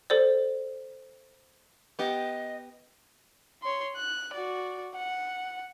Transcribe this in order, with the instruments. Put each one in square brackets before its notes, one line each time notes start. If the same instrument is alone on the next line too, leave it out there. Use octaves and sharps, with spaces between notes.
[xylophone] A4 C5 D5
[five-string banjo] B3 G4 [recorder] D#5
[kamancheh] C#5 C6
F#6
F#4 D5
F#5